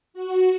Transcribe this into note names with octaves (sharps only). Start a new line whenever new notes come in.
F#4